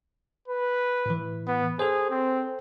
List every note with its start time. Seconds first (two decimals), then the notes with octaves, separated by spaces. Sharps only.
0.48 B4
1.06 A2 E3
1.47 B3
1.79 G#4 A4 C5
2.11 C4